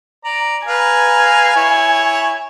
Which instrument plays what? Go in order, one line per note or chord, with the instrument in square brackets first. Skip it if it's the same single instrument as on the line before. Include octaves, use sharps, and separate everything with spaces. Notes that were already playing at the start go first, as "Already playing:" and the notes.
[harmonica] D5 A#5
[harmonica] B4 F5 A#5 [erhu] G#5
[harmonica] E4 C#5